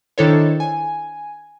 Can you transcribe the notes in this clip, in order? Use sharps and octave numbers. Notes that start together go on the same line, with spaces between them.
D#3 D4 E4 A4 C5 C#5
G#5